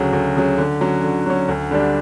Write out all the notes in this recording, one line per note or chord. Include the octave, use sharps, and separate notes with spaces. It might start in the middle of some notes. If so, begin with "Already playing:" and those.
Already playing: D2 C#3 F#3
D2
C#3 F#3
D3
F#3 C#4
D3
F#3 C#4
D2
D3 G3 D4